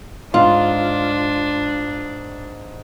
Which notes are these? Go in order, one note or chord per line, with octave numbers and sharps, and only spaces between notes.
G#2 D4 F4